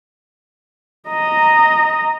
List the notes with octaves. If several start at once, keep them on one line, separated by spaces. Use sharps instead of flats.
D#5 A#5